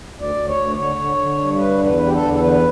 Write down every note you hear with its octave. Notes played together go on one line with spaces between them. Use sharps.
D2
D5
D2
C#5
D2
D3 C#5
D3
D3
G2
D3 B4
E2
B4
D3
G4
A4
E2
A4
D3 B4